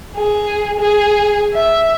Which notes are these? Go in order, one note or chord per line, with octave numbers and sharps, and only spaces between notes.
G#4
G#4
E5